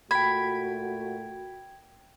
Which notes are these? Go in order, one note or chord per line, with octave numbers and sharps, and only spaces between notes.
A#2 A3 F#4 G5 B5 G#6